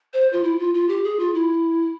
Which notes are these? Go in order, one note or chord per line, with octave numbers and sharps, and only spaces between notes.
C5
F4
E4
F4
F4
G4
G#4
F4
E4